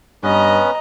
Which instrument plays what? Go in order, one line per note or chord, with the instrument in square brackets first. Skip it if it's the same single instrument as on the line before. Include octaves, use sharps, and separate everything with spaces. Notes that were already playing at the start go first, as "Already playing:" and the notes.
[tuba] G2 [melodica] B3 C#4 B4 [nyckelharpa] D#5 A#5